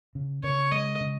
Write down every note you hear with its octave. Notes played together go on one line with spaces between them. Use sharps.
C#3
C#3 C#5
G#3 D#5
C#3